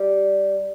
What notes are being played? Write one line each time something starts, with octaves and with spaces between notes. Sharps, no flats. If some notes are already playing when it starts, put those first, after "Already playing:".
Already playing: G3